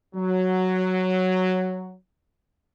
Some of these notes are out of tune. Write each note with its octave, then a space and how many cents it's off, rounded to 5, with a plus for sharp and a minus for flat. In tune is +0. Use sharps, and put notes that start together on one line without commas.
F#3 +0 F#4 +0